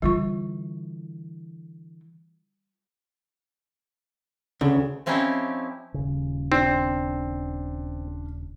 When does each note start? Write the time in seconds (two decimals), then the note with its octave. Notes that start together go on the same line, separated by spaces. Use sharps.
0.02 D3 E3 G3 F4 C#6
4.61 D2 C#3
5.06 F3 C4 C#4 D#4 E4 G4
5.94 D#1 C#3
6.52 C4 D4